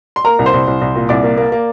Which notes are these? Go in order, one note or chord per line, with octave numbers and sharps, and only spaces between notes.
C6
A#3 A#4 A#5
C2
C5 C6
C2
C2
C2
A#2
C2 D5 D6
A#3
A#3
A#3